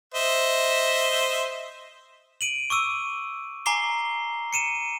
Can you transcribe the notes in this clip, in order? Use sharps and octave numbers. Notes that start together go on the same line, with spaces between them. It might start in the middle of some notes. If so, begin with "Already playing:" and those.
C5 D#5 E5
D7 D#7 F#7
C#6 D6 E6 D#7
G#5 A#5 D6 C7 G7
C#7 D#7 E7